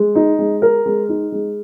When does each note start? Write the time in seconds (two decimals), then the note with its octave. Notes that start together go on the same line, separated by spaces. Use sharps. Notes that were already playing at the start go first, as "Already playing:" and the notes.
Already playing: G#3
0.15 D#4
0.39 G#3
0.62 A#4
0.86 G#3
1.09 D#4
1.32 G#3